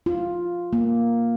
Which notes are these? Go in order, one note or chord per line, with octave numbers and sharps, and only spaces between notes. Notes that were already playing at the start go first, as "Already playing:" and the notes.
F4
A#3